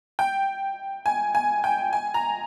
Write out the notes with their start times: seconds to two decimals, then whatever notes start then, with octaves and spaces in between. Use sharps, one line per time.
0.19 G5
1.06 G#5
1.35 G#5
1.64 G5
1.93 G#5
2.14 A#5